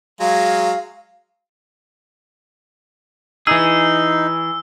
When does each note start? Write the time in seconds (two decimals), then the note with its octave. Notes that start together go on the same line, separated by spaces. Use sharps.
0.20 F#3 G#3 F5
3.47 E3 D#4 G#4 E6